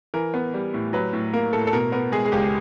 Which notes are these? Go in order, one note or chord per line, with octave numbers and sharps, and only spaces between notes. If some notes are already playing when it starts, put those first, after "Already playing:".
E3 A#4
B3
G3
A2
F#3 B4
A2
A#3 A#4
A2 A4
A4
B2 A#4
B3 A#4
G#3 G#4
G#4
C#2 G4